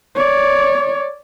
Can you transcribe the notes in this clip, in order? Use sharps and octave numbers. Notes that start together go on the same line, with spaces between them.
C#5 D5